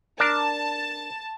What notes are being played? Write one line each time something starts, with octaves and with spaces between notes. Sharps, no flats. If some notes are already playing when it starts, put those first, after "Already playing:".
D4 A#4 A5